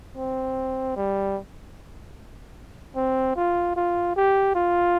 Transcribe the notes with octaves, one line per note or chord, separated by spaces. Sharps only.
C4
G3
C4
F4
F4
G4
F4